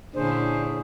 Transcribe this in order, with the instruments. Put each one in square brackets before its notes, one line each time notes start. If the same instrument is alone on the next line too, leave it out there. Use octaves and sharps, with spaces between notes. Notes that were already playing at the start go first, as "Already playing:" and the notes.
[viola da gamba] A#2 D3 E4 [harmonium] C#4 G#4 [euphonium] D4 [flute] C5